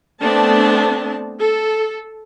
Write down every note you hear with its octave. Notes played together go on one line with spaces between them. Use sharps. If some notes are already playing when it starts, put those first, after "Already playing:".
A3 B3 C4 D4 A5
A4